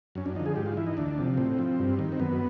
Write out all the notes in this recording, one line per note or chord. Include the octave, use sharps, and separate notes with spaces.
F#2 C#4
D4
D3 F3 D#4
G#4
G#2 G4
F4
E3 E4
D#4
D2 D4
C3 F3
A2 C4
F3
G2
D#3
C4
F#2 B3